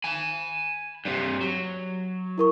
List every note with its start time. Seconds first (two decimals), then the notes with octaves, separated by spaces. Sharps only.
0.04 G#5 B5
1.05 G2 C3
1.41 F#3
2.38 E4 A#4 C#6